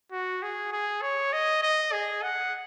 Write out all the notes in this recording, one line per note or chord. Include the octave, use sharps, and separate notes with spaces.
F#4
G#4
G#4
C#5
D#5
D#5
G#4
F#5